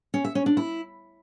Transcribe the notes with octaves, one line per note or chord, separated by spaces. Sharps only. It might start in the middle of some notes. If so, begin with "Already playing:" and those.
C#4
E5
C#4
D4
E4